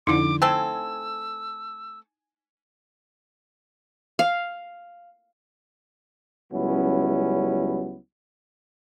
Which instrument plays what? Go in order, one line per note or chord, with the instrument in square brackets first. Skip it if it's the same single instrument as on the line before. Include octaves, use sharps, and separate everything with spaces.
[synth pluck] F2 D3 [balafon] D#4 E4 [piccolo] D6
[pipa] A3 C4 A4 [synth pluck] G#5 [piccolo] E6
[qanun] F5
[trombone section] C#2 F#3 G3 B3 C#4 E4